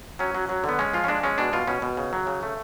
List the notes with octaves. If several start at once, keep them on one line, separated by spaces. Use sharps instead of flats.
F#3 C#4
F#3
F#3
D3 B3
G#3 C#4
F3 F4
C#4
G#3 D4
G#3 C#4
B2 D4
B2 F4
B2 C#4
B2
C#3
F#3
C#3
A3